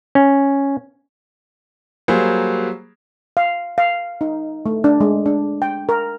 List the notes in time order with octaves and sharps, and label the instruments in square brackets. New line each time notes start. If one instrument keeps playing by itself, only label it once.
[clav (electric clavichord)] C#4
[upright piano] F#3 G3 A#3 G#4 C5
[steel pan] F5
F5
D#4
A3
D4
G#3
D4
G5
A#4